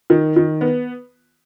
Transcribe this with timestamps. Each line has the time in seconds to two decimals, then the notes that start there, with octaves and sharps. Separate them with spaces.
0.10 D#3
0.36 D#3
0.61 B3